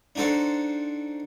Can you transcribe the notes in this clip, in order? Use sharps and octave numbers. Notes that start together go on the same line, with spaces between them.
D4 D#4 F#4 A4 C5